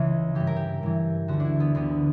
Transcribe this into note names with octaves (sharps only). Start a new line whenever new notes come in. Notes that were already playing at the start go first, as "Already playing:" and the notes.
Already playing: C#2 C#3 E3 E4
G2 E3 G4
A#4
G4
G2 E3
D2 D3 F#4
D4
E4
B3
D2 D3 B3